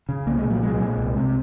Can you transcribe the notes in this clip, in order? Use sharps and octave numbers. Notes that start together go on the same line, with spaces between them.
C#3
C2 A#3
G#3
A#2
F#3
C2 G#3
A#2
C2
C3